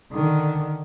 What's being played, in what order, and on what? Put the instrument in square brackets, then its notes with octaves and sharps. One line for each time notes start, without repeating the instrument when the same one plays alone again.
[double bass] D3 D#3